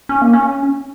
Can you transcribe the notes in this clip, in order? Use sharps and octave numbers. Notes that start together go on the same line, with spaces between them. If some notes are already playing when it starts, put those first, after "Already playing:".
C#4
A#3
C#4